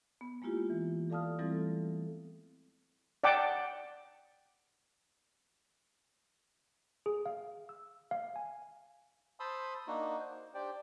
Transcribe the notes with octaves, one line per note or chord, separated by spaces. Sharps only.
B3
G#3 A#3 E4 F4 G4
E3
A4 D5 F5 A5 D#6 F6
E3 G3 A3 C4 E4 A4
D5 F#5 G5 A5 D6
G#4
F5
E6
F5
G#5
C5 A5 B5 C6 D#6 E6
A#3 D4 D#4 F#4
C5
D4 G4 C5 D5 G5 D6